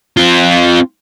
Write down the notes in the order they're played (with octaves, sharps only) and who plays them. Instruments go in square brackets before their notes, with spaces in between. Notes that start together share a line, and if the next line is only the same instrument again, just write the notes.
[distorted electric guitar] C4 F4